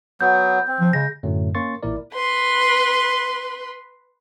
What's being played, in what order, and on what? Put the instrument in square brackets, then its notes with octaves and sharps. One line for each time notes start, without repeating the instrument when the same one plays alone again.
[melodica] F#3 B3 [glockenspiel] G6
[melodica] C4
[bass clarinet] F3
[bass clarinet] C#3 [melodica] G#3 [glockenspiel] A#6
[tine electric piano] F#2 A2 D3 F#3 A3
A#3 C#4 C6 C#6 A6
A1 A#2 E4 A#4 D5
[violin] B4 C6